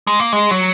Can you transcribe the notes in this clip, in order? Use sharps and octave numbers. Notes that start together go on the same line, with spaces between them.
G#3
A#3
G#3
F#3